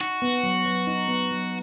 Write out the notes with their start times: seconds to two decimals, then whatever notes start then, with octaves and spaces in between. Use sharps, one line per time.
0.01 D#4 F#4
0.22 B3
0.43 F#3
0.65 F#3
0.87 D#4
1.08 B3
1.31 F#3